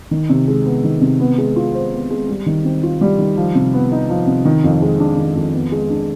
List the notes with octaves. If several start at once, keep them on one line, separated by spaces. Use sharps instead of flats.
D#3
C3
G#3
B3
D#3
C3
B3
G#3
F4
C5
B3
G#3
G3
D#3
C4
F4
G3
D#3
F3
C3
B3
D#4
F3
C3
D#3
F2
G#3
D4
D#3
F2
B3
G#3
D4